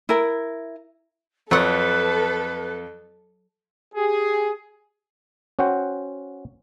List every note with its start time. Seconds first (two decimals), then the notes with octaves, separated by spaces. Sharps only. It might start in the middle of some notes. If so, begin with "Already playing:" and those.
0.09 E4 A#4
1.51 F2 F#3 F4 A4 B4 F#5
3.95 G4 G#4
5.59 C#4 F#4 C5 F#5 G5